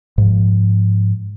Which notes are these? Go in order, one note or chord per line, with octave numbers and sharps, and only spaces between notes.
G#2 F3